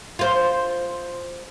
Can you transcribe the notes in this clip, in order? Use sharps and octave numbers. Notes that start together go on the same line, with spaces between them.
F4 C5